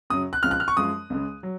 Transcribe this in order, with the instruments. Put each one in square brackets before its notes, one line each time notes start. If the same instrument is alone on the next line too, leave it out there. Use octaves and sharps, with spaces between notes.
[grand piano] F#2 C#3 F#3 D#6
F#6
C#2 C#3 F3 F6
F#6
F6
C#6
F#2 F3 G#3 D#6
C#2 C#3 G#3
F#3